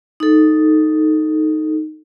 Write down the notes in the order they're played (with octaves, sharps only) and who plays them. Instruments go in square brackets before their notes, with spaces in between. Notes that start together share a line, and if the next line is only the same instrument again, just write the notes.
[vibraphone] D#4 A4